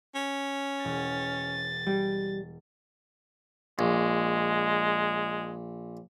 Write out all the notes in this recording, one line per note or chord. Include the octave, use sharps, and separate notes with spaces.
C#4
E1 A6
G3
A#1 G#3